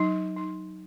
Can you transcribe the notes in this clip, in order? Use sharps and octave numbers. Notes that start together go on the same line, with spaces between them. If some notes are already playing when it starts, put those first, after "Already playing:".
Already playing: F#3 D#4
D#4